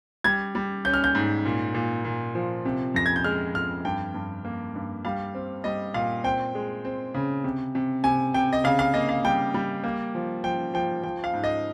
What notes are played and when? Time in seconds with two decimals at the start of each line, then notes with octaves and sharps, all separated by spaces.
0.24 G3 G#6
0.55 G3
0.85 C#4 G6
0.94 F6
1.04 G6
1.15 G#2
1.45 A#2
1.74 A#2
2.05 A#2
2.35 F3
2.65 C3
2.94 F2 A#6
3.06 G#6
3.16 G6
3.24 G#3 F6
3.54 F2 F6
3.85 G2 G5
4.14 G2
4.45 A#3
4.75 G2
5.05 G3 F5
5.34 C4
5.64 G3 D#5
5.94 A#2 F5
6.24 C4 G5
6.55 G#3
6.85 C4
7.14 C#3
7.44 C3
7.75 C3
8.04 C3 G#5
8.34 C3 G5
8.53 D#5
8.64 C#3 F5
8.79 F5
8.94 A#3 D#5
9.09 F5
9.24 G3 G5
9.54 G3
9.84 A#3
10.15 F3
10.44 F3 G5
10.74 F3 G5
11.03 F3 G5
11.24 F5
11.33 G#2
11.44 D#5